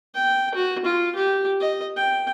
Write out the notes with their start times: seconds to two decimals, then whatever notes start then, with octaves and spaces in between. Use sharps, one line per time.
0.14 G5
0.55 F#4
0.85 F4
1.15 G4
1.60 D#5
1.96 G5